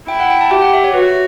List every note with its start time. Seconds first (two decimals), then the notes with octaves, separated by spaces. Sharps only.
0.08 E4 G5
0.20 F#5
0.30 G5
0.41 A5
0.51 G4 G5
0.62 F#5
0.73 E5
0.84 C#5
0.94 F#4 B4